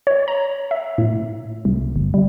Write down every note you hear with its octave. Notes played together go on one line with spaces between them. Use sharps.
C#5
A#5
E5
A2
C2
G1
G3